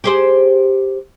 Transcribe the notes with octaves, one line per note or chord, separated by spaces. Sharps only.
G4 G#4 C5